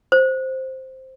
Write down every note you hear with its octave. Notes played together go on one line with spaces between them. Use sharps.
C5